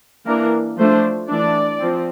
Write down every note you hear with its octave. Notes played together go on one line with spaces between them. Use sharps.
E3 A#3 D4 A#4
F3 A3 D4 C5
E3 A3 D4 D5
F3 C4